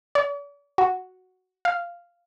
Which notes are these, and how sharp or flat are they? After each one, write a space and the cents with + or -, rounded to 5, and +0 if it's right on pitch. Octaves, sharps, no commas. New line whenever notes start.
D5 -45
F#4 +0
F5 -5